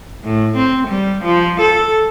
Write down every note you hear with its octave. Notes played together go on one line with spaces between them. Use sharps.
A2
C4
G3
F3
A4